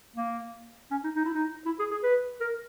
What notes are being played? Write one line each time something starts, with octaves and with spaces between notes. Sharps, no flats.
A#3
C#4
D#4
D#4
E4
D#4
E4
G#4
G#4
B4
A#4